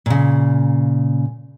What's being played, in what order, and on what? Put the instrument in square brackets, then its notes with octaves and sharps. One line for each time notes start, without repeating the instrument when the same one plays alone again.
[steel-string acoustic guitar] A#2 C#3